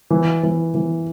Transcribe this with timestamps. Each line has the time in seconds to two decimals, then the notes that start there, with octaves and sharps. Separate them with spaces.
0.10 E3
0.43 E3
0.75 E3